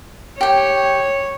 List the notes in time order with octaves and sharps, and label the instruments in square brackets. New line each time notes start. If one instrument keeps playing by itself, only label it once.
[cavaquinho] G4 G5 [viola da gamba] C#5